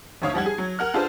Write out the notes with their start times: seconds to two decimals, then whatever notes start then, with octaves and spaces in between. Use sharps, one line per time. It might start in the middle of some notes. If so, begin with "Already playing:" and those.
0.22 G#1 D2 C#5 F5 D#6
0.34 F3 G3 F#5 G#6
0.46 G#4
0.58 F#3
0.79 A#4 F#5 F6
0.94 D4 F4 G#4 A4 B4 C5